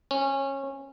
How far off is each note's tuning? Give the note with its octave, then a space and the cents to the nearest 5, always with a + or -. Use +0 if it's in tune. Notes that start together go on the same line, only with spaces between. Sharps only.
C#4 -20